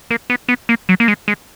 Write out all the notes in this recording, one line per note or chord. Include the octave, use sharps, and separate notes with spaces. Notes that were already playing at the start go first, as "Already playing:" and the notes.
A#3
B3
B3
A#3
F#3
A#3
G#3
G#3